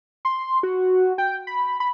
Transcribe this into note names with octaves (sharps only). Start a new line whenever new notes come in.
C6
F#4
G5
B5
B5